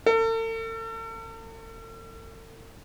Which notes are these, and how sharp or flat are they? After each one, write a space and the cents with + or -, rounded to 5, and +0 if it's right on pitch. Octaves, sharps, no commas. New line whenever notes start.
A4 +45